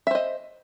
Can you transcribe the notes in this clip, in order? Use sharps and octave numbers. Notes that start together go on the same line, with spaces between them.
C5 D#5 E5